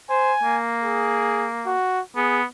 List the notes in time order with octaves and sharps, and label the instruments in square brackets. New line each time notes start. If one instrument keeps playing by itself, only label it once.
[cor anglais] C5 [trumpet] G#5
[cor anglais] A#3
[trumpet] G#4
F#4
[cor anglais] B3 [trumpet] G#4